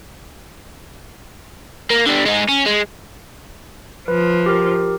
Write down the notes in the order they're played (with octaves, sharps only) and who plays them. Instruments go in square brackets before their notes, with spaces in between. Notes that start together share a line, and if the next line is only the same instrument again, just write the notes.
[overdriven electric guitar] A#3
D3 G3
G#3 D#4
C#4
G#3
[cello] F3 [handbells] B4
[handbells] G4 A#4